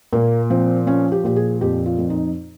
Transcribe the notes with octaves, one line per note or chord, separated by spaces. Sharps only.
A#2 A#3
F3 C4
F3 C#4
G4
A#2 G4
G#4
F2 G4
F4
F2
D#4